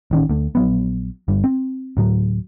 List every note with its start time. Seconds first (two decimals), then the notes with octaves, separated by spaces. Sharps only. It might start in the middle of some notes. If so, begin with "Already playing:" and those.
0.11 A1 D#3 C#4
0.29 D2 A3
0.55 A#1 F#3 B3
1.28 G1 G2
1.44 C4
1.97 D2 A2 F#3